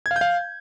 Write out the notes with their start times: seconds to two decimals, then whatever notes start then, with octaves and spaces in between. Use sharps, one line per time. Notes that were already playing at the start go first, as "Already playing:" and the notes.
0.06 G#6
0.11 F5
0.16 G6
0.21 F5